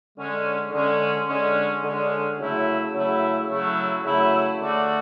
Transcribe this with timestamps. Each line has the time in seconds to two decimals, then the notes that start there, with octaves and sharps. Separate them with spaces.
0.17 D3 G#3 C#4
0.72 D3 G#3 C#4
1.27 D3 G#3 C#4
1.83 D3 G#3 C#4
2.38 C#3 F#3 A3 E4
2.93 C#3 F#3 A3 E4
3.48 C#3 F#3 A3 E4
4.04 C#3 F#3 A3 E4
4.59 D3 A3 D4 F#4